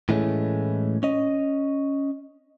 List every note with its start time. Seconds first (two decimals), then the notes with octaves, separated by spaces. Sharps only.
0.09 A2 E3 G#3 A3 C#4
1.03 C#4 D#5